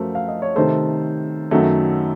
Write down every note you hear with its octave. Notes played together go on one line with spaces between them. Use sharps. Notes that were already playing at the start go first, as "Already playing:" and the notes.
Already playing: F#2 F3 A3 F#4 A#4 C5
F5
D#5
C#5
C3 D#3 A3 A4 C5
F#2 D#3 F#3 A3